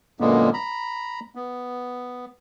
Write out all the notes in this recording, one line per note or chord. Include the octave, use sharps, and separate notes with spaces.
F#2 A#2 D3 G#3 A#3 B3
A#5 B5
B3